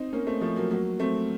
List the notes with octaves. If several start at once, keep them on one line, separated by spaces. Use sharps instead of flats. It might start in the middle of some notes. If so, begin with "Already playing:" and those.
Already playing: C4 D#4
A#3 C#4
A3 C4
F3 A3
F#3 A#3
F#3 A#3
A3 C4